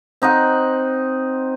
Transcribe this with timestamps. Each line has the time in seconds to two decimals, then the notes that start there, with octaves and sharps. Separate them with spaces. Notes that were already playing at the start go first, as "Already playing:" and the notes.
0.22 C4 D#4 D#5 F#5